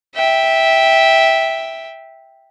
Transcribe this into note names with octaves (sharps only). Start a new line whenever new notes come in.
E5 G5